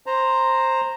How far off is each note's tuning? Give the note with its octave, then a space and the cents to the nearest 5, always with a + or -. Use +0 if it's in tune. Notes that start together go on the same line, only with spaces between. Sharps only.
C5 +10 A#5 -5